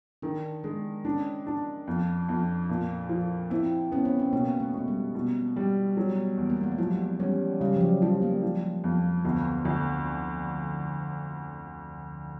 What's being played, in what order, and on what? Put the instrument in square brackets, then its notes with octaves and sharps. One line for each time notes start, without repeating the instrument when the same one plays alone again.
[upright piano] D#3 [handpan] D4
[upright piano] G#3 [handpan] D4
[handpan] C#4 [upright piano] D4
[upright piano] D4
F2
F2
A#2
F3
[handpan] C4 [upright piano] E4
[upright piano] B3 [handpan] C#4
[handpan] C4
C#4
[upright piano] B2 [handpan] A#3
[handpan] A3
[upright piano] B2 [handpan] G#3
[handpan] G3
[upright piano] B2
G3
F#3
E2
[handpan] A#3
A3
G#3
G3
[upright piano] F3 [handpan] F#3
[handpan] G3 [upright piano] C#4
[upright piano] C#3 [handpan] G3
[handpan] F3
F#3
[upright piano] F3 [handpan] G3
[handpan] A#3
[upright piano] F3
F2
[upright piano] D2 [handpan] B3
[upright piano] D2